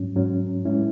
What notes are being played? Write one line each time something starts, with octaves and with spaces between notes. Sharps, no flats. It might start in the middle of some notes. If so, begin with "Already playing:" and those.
Already playing: G#2 F#3 C#4
G#2 F#3 C#4
A2 G#3 C#4 E4